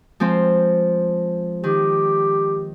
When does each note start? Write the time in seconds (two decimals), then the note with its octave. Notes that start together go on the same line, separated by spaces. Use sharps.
0.20 F3 G#3 C4
1.64 D#3 G4